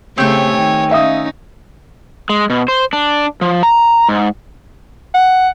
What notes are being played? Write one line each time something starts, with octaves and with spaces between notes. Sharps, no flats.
C#3 A3 C4 G4 C#5 G5 G#5
D#3
C#4 D#4 E5 F5 D#6
G#3
B2
C5
D4
F3
A#5
G#2
F#5